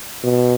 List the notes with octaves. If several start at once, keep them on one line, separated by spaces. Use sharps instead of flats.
B2